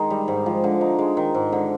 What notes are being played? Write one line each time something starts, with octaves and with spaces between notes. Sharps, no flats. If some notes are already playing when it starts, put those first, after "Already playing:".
Already playing: D#3 G#3 D#4
G3
G#2
F3
D3
D#4
G#3
D#3
G#2
D3